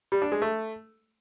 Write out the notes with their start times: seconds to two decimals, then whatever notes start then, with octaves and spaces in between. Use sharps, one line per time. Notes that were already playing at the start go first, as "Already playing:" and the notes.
0.12 G3
0.22 D4
0.32 G#3
0.42 A3